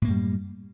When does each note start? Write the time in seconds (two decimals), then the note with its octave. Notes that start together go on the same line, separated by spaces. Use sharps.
0.02 A2
0.05 A#3
0.08 F#2
0.10 G3